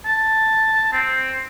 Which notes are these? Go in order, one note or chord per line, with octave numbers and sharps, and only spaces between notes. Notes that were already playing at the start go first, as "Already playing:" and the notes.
A5
C4